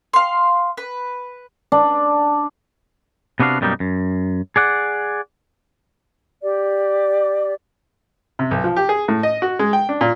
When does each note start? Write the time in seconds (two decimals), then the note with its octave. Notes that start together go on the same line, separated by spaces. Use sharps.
0.13 F5 C6
0.77 B4
1.72 D4
3.40 C3 B3 D4 F#4 F5
3.61 F#2 B2 G3 A#3 D#4
3.80 F#2
4.56 G#4 D5 F#5
6.41 G4 D5
8.39 C3
8.51 B1
8.64 F3
8.76 G4
8.89 G#4
9.08 A2
9.23 D#5
9.42 F#4
9.59 G#3
9.73 G5
9.89 D4
10.01 A#2